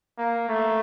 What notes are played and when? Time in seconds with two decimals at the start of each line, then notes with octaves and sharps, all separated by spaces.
0.18 A#3
0.49 A3